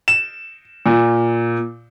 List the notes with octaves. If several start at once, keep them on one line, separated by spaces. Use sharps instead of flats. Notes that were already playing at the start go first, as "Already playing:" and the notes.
E7
A#2